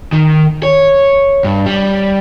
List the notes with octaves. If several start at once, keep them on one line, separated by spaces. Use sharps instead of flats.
D#3
C#5
G2
G3